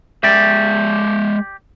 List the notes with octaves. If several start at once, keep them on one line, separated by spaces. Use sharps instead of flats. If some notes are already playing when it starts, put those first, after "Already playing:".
G#3 G4 D5 E5